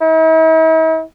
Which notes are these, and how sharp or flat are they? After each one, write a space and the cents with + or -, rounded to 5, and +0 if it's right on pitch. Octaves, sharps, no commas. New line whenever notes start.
E4 -45